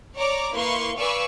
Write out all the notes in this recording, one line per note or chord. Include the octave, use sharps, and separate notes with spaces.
C#5 D5 A#5 D6
A#3 E4 B4 F5 C6 C#6
B4 D5 F5 G#5 C#6 E6